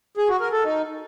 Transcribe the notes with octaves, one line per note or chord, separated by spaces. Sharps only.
G#4
F#4
A#4
A4
D#4